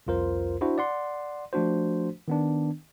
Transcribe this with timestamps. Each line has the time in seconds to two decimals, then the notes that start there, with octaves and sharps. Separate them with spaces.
0.07 C2 F2 F4 A#4 C5
0.61 D4 E4 F#4 C5
0.78 D5 F#5 C6
1.53 F3 A3 D4 F#4 C5
2.28 D#3 B3 D4